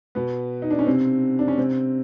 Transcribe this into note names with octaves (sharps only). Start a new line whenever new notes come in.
B2 B3
D#4
D4
C#4
C3 C4
D4
C#4
C3 C4